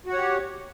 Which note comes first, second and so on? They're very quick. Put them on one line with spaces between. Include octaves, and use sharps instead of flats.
F#4 F#5 C#5 G4